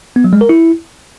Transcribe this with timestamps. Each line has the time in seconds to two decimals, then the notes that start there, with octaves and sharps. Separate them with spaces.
0.16 B3
0.24 F#3
0.33 G#3
0.41 A#4
0.49 E4